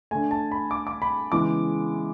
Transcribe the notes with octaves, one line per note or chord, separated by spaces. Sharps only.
D3 A3 G#5
A5
B5
D6
D6
B5
C#3 E3 G#3 B3 D6